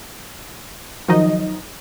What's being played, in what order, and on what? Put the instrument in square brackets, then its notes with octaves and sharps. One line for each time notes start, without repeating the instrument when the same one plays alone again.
[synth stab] D#3 F3 F#3 D#4 D#5